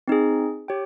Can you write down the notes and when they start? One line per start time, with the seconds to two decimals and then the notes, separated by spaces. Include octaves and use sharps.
0.08 C4 D#4 G#4
0.68 G4 C#5 G5